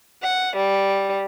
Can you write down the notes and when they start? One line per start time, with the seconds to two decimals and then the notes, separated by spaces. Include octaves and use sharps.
0.23 F#5
0.57 G3